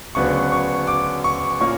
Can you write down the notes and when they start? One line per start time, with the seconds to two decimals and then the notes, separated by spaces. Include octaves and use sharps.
0.15 D2 C#3 F#3 B3 D4 C#6
0.52 C#6
0.87 D6
1.24 C#6
1.60 A#2 A#3 C#4 C#6